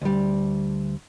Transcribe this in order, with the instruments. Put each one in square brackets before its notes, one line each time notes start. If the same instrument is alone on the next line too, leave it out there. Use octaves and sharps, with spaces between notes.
[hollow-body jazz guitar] D2 G3